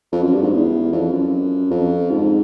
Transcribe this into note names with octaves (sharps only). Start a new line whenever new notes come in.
F2
F#2
G2
G#2
E2
F2
F#2
F2
G#2